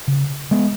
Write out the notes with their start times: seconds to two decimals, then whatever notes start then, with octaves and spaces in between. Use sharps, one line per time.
0.08 C#3
0.51 G#3 B3